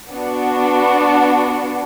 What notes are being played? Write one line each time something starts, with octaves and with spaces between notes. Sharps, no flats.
B3 D4 F#4